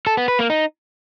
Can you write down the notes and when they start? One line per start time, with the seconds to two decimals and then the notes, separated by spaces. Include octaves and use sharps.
0.07 A4
0.17 B3
0.28 B4
0.39 A#3
0.50 D#4